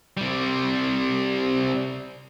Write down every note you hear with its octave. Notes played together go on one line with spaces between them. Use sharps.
C3 G3